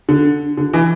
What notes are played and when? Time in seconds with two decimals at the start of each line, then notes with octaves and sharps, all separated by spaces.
0.09 D3
0.57 D3
0.73 E3